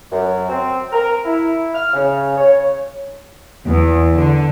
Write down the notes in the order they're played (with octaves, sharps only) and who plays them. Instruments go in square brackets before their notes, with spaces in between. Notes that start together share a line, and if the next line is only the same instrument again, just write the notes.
[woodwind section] F#2
C4
A#4
E4
F6
C#3
C#5
[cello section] E2
D3